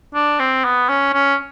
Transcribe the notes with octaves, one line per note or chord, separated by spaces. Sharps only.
D4
C4
B3
C#4
C#4